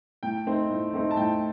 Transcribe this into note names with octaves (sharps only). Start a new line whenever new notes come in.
A2 G5
A3 C4 D#4
A2
A3 C4 D#4
A5
A2 G5